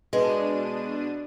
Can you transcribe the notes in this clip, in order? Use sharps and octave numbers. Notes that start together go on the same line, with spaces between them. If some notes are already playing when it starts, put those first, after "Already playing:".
B2 G#3 D4 B4 D#7